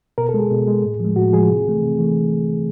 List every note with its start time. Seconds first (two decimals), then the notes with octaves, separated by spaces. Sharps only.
0.18 B2 A#4
0.29 A4
0.34 G#3
0.39 G#4
0.51 B2
0.67 G#3
0.84 A2
1.00 F3 G#3
1.16 A2 F#4
1.32 F3 G#3 G#4
1.49 C3
1.66 E3 A3
1.83 C3
1.99 E3 A3